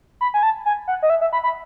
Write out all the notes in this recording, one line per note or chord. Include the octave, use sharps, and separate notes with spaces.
B5
G#5
A5
G#5
F#5
D#5
E5
E5
B5
B5